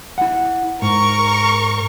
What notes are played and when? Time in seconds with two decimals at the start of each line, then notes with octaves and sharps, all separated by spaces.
0.18 E4 F#5
0.82 G#2 A#4 C#6